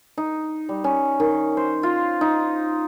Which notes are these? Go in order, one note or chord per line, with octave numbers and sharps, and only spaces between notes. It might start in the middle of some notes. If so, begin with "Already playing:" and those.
D#4
G3
C#4
D#3
C5
F4
D#4